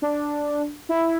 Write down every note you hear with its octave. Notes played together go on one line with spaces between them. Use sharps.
D4
E4